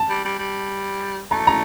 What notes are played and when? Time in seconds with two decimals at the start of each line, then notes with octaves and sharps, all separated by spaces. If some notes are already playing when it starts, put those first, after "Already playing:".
Already playing: A5
0.10 G3
0.25 G3
0.39 G3
1.31 A3 A#5
1.47 A#5